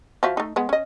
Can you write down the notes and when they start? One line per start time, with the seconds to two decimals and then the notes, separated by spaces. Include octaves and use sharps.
0.23 F3 F#4 E5
0.37 A3 D#4
0.56 G#3 B3
0.69 C#4 D#5